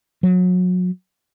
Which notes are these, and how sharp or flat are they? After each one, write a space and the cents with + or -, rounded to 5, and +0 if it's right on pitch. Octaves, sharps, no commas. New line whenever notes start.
F#3 -30